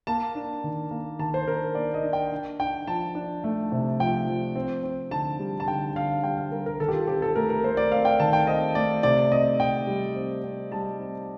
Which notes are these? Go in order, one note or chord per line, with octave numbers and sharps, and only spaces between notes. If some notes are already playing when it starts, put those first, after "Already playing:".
A#3 A5
D4
D#3
A#3
D#3 A5
C5
D4 A#4
A#3 D5
D#5
D4
G5
D4
D4 G5
F3 A5
D4
A3
C3
F3 G5
F3
C4
C4
D3 A5
G3
A5
D3 G5
D3 F5
G3 G5
F5
G3 A#4
A#4
D#3 A4
G4
F4
C4 G4
A4
A3 A#4
A#4
A3 C5
D5
C4 F5
G5
D#3 A5
G5
C4 D#5
A3 D5
C3 D5
C4 D#5
C3 G5
G3
C4
C4
G3 A5
C4